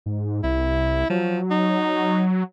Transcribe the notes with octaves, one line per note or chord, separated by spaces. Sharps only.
G#2
C2 E4
F3 F#3
D#4